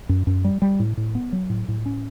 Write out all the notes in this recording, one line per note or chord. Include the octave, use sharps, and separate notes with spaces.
F#2
F#2
G3
G3
A2
A2
B3
F#3
A2
A2
C#4